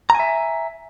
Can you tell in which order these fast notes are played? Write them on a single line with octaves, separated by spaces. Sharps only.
A#5 G#5 E5